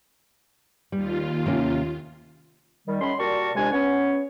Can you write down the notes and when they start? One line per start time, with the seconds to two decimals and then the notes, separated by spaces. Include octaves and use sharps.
0.92 D#2 G3 F4
1.46 C3 A#3 C#4
2.87 D#3 G3
3.00 F#2 G#3 C#4 B5 C6
3.19 A#2 G3 F#4 A#4 A5 C#6
3.54 C2 F2 C3 G#3 D4 G#5
3.72 B3 C#4 C#5